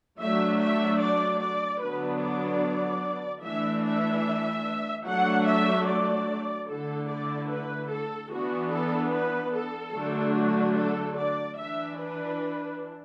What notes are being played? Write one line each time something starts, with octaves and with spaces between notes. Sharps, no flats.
F#3 A3 D4 E5
E5
D5
D5
D3 F#3 B3 D4 B4
D5
E3 A3 D4 E5
E5
F#3 A3 D4 F#5
E5
D5
D3 A3 E4 A4
D5
B4
A4
E3 B3 D4 F#4
A4
B4
A4
D3 F#3 A3 D4
F#4
A4
D5
E3 D4 E5
B4